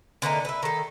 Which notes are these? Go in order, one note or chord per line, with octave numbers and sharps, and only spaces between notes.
D3 E3 A#3 D#4
B4 E5
D#3 A4